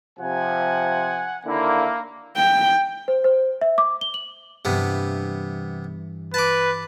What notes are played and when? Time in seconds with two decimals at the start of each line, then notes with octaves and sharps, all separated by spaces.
0.19 C3 F3 F#5 G#5
1.46 D#2 D3 A#3 E4
2.36 G5
3.08 C5
3.24 C5
3.61 E5
3.78 D6
4.01 G7
4.14 F#7
4.65 G2 C3 E3 B3
6.34 B4 A5 D6